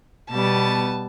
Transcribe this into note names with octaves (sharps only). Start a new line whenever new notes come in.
B2 G3 B3 A5